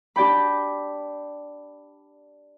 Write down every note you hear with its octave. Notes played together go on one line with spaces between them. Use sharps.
D4 G4 D5 G5 B5